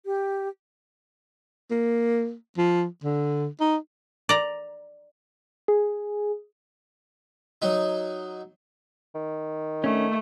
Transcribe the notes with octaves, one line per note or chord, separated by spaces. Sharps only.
G4
A#3
F3
D3
D#4
D5 A#5
G#4
F#3 D#4
D#3
A3 C#4 D4